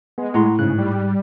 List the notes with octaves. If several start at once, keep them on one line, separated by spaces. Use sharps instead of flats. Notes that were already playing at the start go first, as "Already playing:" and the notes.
G#3 B3
A2 F#5 A#5 C6
G#2 C#3 F#6
G3